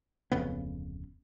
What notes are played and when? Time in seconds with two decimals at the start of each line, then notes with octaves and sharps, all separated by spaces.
0.32 D1 F2 C#3 B3